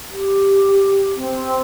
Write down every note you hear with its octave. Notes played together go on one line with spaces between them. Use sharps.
G4
C4